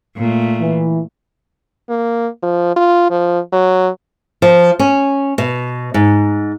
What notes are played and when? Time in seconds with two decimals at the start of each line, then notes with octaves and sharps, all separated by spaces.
0.17 A#2 A3
0.60 E3
1.89 A#3
2.43 F3
2.76 F4
3.10 F3
3.53 F#3
4.42 F3
4.79 C#4
5.38 B2
5.94 G#2